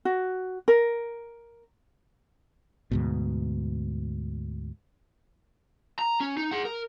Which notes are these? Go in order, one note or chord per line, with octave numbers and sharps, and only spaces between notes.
F#4
A#4
D2 G#2 B2
A#5
C#4
D#4
G#4 F#5
A#4